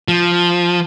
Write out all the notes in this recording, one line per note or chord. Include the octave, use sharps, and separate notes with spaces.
F3